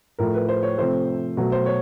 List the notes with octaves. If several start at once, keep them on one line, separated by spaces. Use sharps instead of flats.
A2 F3 A3 A#4
B4
C5
C#5
C3 F3 A3 C5
B2 F#3 A3
C5
C#5